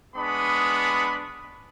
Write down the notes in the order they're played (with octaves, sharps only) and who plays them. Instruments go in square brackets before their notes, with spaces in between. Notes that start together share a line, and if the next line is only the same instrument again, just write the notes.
[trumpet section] G#3 B3 D4 B5 C#6 D#6